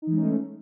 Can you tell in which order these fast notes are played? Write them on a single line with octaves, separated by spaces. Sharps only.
D#4 E3 G#3 C#4 A3